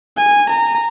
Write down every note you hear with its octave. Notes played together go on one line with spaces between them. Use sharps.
G#5
A#5